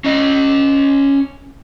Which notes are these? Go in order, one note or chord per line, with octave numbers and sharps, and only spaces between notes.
C#4 D#5